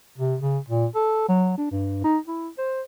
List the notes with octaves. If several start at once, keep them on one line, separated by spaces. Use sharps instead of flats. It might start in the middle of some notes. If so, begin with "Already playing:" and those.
C3
C#3
A#2
A4
F#3
D4
G2
D#4
E4
C5